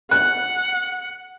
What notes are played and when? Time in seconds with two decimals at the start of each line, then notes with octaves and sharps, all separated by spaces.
0.11 F#5 F#6